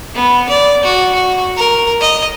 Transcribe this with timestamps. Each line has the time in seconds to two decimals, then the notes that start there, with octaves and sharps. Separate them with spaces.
0.15 B3
0.49 D5
0.83 F#4
1.14 F#4
1.56 A#4
2.01 D#5